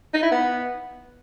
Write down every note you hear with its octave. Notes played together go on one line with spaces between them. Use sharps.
D#4
E4
B3